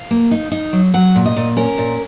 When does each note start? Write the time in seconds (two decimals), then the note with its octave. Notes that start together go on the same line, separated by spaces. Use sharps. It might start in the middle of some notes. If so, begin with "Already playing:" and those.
Already playing: F5
0.11 A#3
0.31 D#4
0.52 D#4
0.73 F#3
0.94 F#3 F#5
1.15 A#2
1.25 D#5
1.36 A#2
1.57 C#4 A#4
1.78 A#2